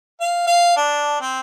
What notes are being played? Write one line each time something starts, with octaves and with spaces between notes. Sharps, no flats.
F5
F5
D4
C4